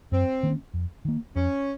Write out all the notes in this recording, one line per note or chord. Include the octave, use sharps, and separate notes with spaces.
F#2 C4
D#3 A#3 C#4
F2
D#3 A#3
F2 C#4